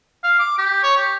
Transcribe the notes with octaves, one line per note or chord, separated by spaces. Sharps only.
F5
D6
G4
C#5
G4